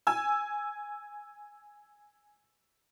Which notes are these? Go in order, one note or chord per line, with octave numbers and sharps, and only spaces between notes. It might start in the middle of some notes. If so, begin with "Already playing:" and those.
G#5 E6